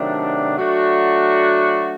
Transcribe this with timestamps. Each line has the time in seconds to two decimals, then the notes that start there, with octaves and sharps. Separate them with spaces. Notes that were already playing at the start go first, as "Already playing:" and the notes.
Already playing: C3 D#3 F#3 A3 D4
0.57 F#3 A3 D4 F#4